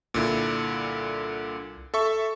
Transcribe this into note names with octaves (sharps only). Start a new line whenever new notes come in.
C2 A#2 D3 E4
A4 E5 C#6